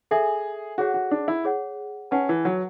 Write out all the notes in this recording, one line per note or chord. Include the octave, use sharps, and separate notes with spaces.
G#4 A4 E5 G#5
F#4 G#4 C#5 F#5
F#4
D4
E4
G#4 C#5 F#5
C#4 B4 F#5 A5
E3
F#3